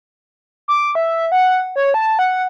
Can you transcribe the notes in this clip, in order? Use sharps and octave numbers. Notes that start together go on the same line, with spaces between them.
D6
E5
F#5
C#5
A5
F#5